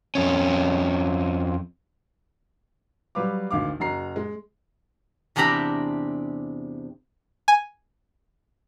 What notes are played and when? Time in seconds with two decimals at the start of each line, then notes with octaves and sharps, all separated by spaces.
0.15 F2 C#4
3.15 F#3 G3 B4 F5 D6
3.51 G#1 D2 F5 D6
3.80 F#1 F#4 A#5 C7
4.16 G#3
5.36 E2 C3 D4 G4 A#5 B5
7.48 G#5